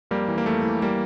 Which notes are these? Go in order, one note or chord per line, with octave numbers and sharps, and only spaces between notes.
F2 G3 A#3
E3
A#3
F2 A3
E3
G3 A#3